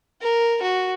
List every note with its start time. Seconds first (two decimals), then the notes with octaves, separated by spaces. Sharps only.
0.22 A#4
0.62 F#4